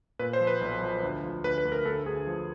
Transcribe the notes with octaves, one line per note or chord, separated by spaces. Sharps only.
A#2 B4
C5
F3
B4
B1
F3
D2
F3
D2 B4
B4
D2
A#4
D2 A4
D2 G#4
F3